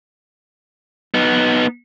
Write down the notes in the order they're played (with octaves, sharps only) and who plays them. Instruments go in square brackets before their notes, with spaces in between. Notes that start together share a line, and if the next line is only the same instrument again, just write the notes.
[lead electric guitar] B3 D#4